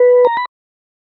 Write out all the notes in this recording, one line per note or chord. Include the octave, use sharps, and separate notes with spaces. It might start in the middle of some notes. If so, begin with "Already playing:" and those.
Already playing: B4
A#5
B5